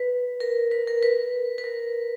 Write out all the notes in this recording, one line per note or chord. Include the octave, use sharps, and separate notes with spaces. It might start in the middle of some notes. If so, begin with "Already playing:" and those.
Already playing: B4
A#4
B4
A#4
B4
B4
A#4